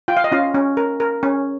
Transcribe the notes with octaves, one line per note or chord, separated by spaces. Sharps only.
F4 G5
F5
D#5
C#4 F4 F5
C#4
A#4
A#4
C#4